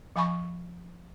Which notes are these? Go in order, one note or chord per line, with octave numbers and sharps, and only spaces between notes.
F3 F5 G#5 B5 C#6